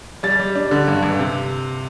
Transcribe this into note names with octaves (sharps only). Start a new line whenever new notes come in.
G3 A6
G3
D4
D3
G2
G2
C3